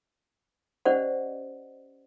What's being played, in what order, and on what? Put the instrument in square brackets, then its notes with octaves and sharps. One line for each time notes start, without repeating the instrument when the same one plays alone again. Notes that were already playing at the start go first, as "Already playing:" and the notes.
[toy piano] C#4 G4 C5 D5 D#5 F#5